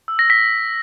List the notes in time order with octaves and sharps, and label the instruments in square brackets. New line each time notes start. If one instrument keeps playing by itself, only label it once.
[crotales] E6
A#6
B6